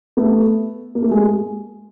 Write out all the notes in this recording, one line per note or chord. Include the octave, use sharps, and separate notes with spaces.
A3 B3
A#3
A3
G#3